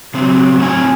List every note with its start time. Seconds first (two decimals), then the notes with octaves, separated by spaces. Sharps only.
0.14 C#3 F#3 C4
0.58 A2 C4 G#5